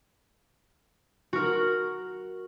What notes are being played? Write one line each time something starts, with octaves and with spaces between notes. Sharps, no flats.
F#4 A#4